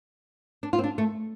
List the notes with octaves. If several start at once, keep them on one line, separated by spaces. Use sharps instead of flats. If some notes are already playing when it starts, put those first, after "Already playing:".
D4
F4
C4
D4
A3